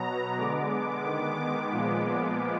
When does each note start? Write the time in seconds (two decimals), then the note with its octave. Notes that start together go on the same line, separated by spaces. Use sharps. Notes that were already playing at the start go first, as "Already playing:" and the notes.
Already playing: B2 F#3 B3 A#5
0.38 D3 G#3 B3 D6
1.05 D#3 G#3 B3
1.72 A#2 F3 G#3 B3